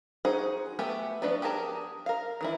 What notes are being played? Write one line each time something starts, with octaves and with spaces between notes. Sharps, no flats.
D#4 F#4 G#4 C5
A3 B3 G4 E5 G#5
F3 B3 D4 F#4 B4
G4 G#4 A#4 A5
A#4 F5
D#3 E3 E4